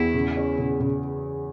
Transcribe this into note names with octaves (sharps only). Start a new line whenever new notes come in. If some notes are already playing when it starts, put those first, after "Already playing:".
Already playing: E2 E4
C#3
C#4
C#3
C#3